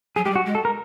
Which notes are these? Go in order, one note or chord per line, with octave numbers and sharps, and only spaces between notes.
F#3 G#4
G#3 G4
G3
F#4
G#3
A4
A#4